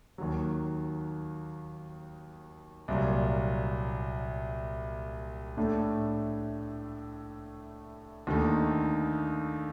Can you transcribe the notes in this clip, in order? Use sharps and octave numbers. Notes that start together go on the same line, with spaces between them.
D#2 D#3 F#3
C2 A#2 F#3
A2 A3 D4
D#2 D3 A3 D#4